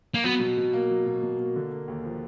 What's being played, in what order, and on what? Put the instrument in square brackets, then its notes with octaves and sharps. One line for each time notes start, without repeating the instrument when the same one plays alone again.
[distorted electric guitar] A#3
[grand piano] F#3 [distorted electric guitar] B3
[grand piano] B2
B2
A#3
F#3
B2
B2
A#3
D3
A#3
D#2
F3